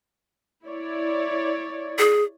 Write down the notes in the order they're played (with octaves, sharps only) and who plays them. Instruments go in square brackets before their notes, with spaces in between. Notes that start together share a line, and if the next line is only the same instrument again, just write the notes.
[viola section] E4 C#5 D5
[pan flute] G#4